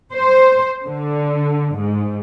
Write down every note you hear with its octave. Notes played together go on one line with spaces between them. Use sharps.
C5
D3
G#2